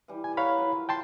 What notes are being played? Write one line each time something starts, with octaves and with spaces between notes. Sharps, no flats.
E3 G3
G#5
A#4 C#5 F5 F#5 B5
F#3 E4 F4
G5 A5 C6